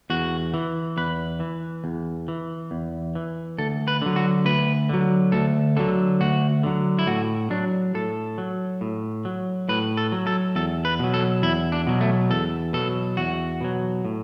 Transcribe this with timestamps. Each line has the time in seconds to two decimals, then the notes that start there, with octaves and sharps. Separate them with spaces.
0.10 E2 F#4
0.54 E3
0.97 E2 B4
1.40 E3
1.84 E2
2.28 E3
2.71 E2
3.15 E3
3.58 D2 A4
3.88 B4
4.02 D3 F#3
4.16 F#4
4.45 D2 B4
4.89 D3 F#3
5.32 D2 A4
5.77 D3 F#3 A4
6.20 D2 F#4
6.63 D3 F#3
6.99 E4
7.07 A2 F#4
7.50 F#3 D4
7.95 A2 A4
8.38 F#3
8.81 A2
9.25 F#3
9.69 A2 B4
9.97 A4
10.12 F#3
10.27 A4
10.56 E2 A4
10.85 B4
10.99 B2 F#3
11.14 A4
11.43 E2 E4
11.72 D4
11.87 B2 F#3
12.01 A3
12.30 E2 A4
12.73 B2 F#3 A4
13.17 E2 F#4
13.61 B2 F#3
14.05 A2